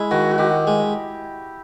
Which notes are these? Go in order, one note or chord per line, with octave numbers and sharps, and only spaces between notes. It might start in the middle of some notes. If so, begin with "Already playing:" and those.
Already playing: G#3 E4
D#3 F#4
F#4
D#3 G4
G#3